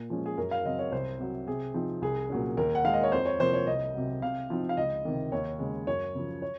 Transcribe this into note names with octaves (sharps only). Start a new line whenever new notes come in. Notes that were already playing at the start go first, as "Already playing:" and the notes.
Already playing: A#2
F3 G#3 C#4
G#4
F#2 A#4
F5
C#3 F#3 C4 D#5
C#5
C2 C5
C3 F#3
C3 G#4
F3 C4 D#4
C2 G#4
A#2 F#3 C#4
D#2 A#4
F#5
D#3 G#3 D#4 F5
D#5
C#5
F2 C5
C#5
C3 F3 A#3 C5
C#5
C2 D#5
C3 F#3
C3 F5
F3 C4 D#4
F5
C#2 D#5
C3 D#3
D#2 C#5
C#3 G#3
F#2 C#5
C#3 F3
C#5